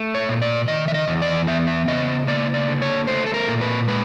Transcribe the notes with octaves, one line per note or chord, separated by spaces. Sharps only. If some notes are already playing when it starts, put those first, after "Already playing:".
Already playing: A3
C#5
A#2
D5
D#3 D#5
E5
D#5
E2
D5
B3 E5
E5
C#3 D#5
A#3 D5
D5
D3
C#5
A3 C5
A4
A#4
A#2
B4
G#3 B4